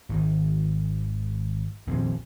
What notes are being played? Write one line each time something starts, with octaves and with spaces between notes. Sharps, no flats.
G#1 D#3
D#1 A#1 F2 C4